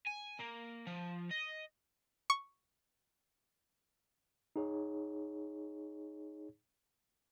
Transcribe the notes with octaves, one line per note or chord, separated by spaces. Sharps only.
G#5
A#3
F3
D#5
C#6
D#4 G#4 C#5